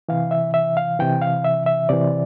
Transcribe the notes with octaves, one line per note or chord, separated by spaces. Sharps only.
C3 E3 F5
E5
E5
F5
C3 E3 G5
F5
E5
E5
C3 E3 D5